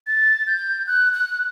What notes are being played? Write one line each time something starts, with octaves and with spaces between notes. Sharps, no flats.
A6
G6
F#6
F#6